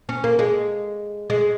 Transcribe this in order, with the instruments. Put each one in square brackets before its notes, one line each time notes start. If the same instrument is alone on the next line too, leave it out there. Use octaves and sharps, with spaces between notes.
[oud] C#4
A#3
G#3
G#3